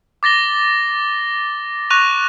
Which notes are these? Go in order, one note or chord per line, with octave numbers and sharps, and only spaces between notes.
D6 A6 A#6 G7
C#6 F#6 A#6 D#7 F7